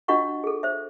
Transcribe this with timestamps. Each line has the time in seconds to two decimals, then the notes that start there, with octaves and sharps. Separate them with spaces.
0.08 D4 F4 F#4 D#5 F#5 C#6
0.44 G#4 A4
0.63 C5 E5